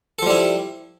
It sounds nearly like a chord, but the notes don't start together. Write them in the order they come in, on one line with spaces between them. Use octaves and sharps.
A4 F3 G3 E4